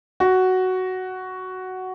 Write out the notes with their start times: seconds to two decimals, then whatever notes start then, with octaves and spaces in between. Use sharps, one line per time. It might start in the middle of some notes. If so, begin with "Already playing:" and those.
0.20 F#4